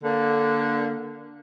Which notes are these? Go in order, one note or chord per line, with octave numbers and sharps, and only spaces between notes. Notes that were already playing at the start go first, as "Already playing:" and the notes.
D3 A#3